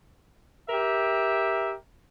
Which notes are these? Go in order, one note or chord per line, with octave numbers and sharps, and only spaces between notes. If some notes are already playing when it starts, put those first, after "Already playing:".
G4 A#4 E5